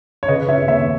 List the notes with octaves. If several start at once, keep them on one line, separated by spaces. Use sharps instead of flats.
C#5
C#3 B4 D#5
C#3 C#5 E5
D#2 C#5 E5